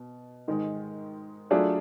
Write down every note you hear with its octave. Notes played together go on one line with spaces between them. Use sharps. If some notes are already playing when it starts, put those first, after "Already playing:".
Already playing: B2
G#2 D#3 G#3
F#3 A3 D4 F4 G#4